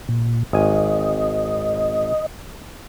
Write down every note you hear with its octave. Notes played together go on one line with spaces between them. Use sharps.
A#2
G#1 D#5 G#5